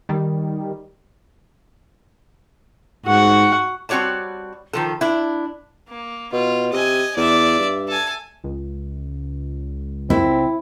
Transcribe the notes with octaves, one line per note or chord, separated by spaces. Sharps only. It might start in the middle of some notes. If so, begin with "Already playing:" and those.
D#3 G3
G#2 F#4 F#5
G3 C4 F#4 C#5 D5 A5
D#3 F3 A4
D4 E4
A#3
B2 F4
C3 D#5 G#5
E2 D5 E5
G2
A4 G#5
C#2
C4 E4